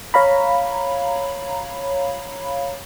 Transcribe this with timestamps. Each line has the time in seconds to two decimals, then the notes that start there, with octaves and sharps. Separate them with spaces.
0.14 C#5 F5 A#5 B5